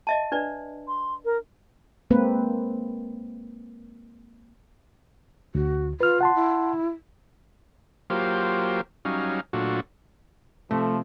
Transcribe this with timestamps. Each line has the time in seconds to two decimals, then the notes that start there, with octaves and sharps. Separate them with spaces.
0.07 D#5 E5 A5
0.32 D4 B4 D5
0.88 C6
1.25 A#4
2.10 G#3 A#3 C4 B4
5.55 D2 F#4
6.01 F4 B4 F6
6.21 F#5 A5 C6
6.35 E4
8.10 F#3 A#3 F4 G4 C5
9.05 F#3 G3 C#4 D#4 F5
9.53 A#2 F#3 A3 D4 F4 F#4
10.71 C3 F3 A3